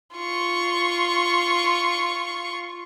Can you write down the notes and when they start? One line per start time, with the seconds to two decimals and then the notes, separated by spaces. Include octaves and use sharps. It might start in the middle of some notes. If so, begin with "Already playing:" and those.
0.17 F4 C#6